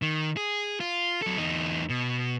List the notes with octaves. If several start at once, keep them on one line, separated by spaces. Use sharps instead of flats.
D#3
G#4
F4
F#3 A4
E2 D#4
B2